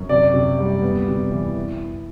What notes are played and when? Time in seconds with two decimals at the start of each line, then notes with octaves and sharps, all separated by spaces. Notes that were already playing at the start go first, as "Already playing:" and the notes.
Already playing: F#2
0.09 C3 D5
0.34 C3
0.59 G3
0.82 B3
1.08 C3
1.31 E3
1.56 E4